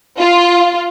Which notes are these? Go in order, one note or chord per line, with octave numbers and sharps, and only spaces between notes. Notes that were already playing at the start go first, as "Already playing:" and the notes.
F4